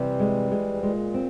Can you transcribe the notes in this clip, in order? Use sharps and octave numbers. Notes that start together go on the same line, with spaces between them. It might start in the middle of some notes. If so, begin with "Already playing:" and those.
Already playing: C3 E3 G3
G#3
G#3
G#2
A#2 G#3
C4